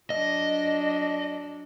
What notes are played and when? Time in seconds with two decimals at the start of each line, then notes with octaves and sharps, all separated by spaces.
0.10 F#3 D4 D#5